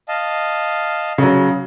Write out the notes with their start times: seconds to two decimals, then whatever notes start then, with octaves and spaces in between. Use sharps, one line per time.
0.08 D#5 F5 A5
1.18 C#3 F#3